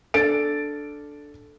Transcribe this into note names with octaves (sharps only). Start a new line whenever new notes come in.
D4 A4 A6 D7